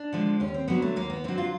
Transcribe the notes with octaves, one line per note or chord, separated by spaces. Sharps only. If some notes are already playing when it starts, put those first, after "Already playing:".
Already playing: D4
D3 F3 G#3
D#2 C#4
C4
D3 F#3 B3
A3
D#2 A#3
B3
D3 F#3 C4
F4